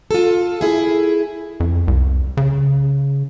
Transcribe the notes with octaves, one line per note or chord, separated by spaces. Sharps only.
F4 A4
E4 G#4
F2
C2
C#3